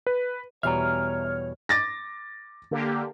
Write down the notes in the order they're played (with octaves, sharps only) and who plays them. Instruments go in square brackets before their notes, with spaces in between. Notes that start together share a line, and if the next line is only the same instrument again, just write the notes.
[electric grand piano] B4
[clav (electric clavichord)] E2 B2 G3 [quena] C#5 [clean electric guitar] E5 G#5 A#5 [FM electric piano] F6
[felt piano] D6 A6 A#6
[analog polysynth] D3 A#3 G4